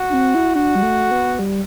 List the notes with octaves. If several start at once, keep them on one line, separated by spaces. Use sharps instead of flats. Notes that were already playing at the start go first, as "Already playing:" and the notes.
Already playing: F#4
D4
C4
E4
D4 F#4
G3
A3
B3
G3